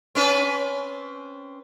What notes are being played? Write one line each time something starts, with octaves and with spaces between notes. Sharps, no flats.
C4 C#4 B4